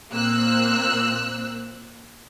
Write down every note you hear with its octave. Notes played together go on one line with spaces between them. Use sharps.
A#2 A#3 C4 E6 F#6